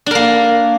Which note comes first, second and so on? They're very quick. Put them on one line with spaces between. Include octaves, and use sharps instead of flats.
D4 A#4 A#3